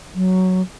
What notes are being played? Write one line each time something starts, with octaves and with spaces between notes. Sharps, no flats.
F#3